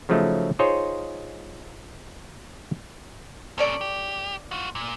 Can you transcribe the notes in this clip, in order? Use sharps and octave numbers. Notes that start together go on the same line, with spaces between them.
C#3 F3 F#3 A3 D#4
D#4 F4 G#4 C5 C#5 D#5
A#2 C#4 A4 C#5 D5
G4
F4 F#4
A#2